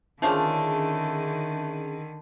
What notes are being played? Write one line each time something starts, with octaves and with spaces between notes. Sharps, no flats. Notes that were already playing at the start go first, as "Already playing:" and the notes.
D3 D#3 F3 A3 A#3 C#4 D4 G#4